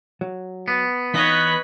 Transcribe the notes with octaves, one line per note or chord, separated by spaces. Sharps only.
F#3
B3
E3 D#4 B4 C#5 D#5 F5 F#6 B6